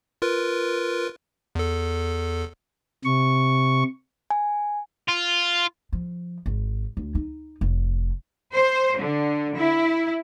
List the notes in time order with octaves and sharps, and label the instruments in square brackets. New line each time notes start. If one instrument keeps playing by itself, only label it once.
[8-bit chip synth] F4 A#4 B4
E2 A4
[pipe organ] C3 C#6
[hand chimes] G#5
[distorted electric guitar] F4
[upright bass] F3
G#1
D2
D#4
F1
[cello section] C5
D3
E4